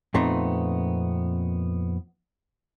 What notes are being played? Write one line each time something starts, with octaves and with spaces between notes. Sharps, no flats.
F2 A#2 A3 B3 C4 D#4